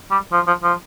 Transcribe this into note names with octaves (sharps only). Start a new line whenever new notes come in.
G3
F3
F3
F3